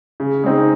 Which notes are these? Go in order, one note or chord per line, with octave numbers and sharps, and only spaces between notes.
C#3
G#3 C4 D#4